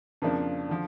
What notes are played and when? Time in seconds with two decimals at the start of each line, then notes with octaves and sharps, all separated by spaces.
0.22 F2 C#3 F3 A#3 D4
0.69 D3 F3